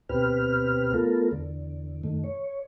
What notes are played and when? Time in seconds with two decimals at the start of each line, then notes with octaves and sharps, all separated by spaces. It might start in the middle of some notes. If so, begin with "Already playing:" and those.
0.09 D2 B2 C4 G4 B4 F6
0.94 A3 B3 F4 A4 A#4
1.31 E2 D3
2.04 F#2 D#3 A3
2.24 C#5